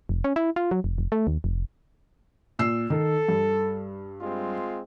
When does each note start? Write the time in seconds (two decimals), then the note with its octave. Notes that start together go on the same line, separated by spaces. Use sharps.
0.09 F1
0.24 C#4
0.36 E4
0.56 F4
0.71 F#3
0.84 F1
0.98 F1
1.12 A3
1.27 D#2
1.44 F1
2.59 A#2 E6 C7
2.90 D#3 A4
3.28 G2
4.21 G#3 C4 F4